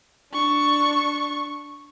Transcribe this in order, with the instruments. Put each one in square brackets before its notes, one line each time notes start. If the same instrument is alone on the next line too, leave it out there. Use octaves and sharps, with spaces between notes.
[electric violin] D4 C#6